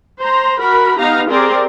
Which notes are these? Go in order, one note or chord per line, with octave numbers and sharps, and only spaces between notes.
C5 A#5
F#4 A#4 B5
B3 D#4 G4 F5 A#5
C4 G4 G#4 A#4 D5 C6